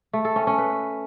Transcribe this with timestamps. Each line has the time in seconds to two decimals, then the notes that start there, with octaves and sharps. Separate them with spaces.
0.13 A3
0.25 A4
0.36 C#4
0.47 C#4
0.58 B4